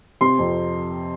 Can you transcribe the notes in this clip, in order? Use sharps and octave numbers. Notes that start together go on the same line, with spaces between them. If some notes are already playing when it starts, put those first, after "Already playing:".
C3 C6
F2